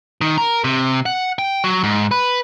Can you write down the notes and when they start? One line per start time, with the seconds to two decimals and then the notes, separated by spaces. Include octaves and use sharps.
0.21 D#3
0.38 A#4
0.64 C3
1.06 F#5
1.39 G5
1.64 F#3
1.84 G#2
2.11 B4